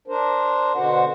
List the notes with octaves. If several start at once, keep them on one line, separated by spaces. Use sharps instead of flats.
D4 A#4 C5
B2 D3 F#4 C5 F#5